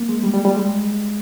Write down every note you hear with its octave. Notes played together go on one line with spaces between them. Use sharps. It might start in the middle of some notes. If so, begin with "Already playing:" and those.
Already playing: A#3
G#3
G3
G3
G3
G#3